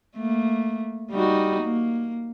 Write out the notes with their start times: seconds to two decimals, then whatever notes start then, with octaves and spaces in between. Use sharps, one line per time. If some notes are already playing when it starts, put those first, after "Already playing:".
0.16 A3 A#3
1.11 G3 D#4 F#4
1.62 A#3